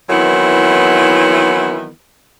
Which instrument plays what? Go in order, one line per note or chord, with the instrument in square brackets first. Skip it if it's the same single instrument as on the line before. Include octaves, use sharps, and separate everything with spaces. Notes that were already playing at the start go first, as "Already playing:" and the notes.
[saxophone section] D#3 E3 F#3 B3 C4 E4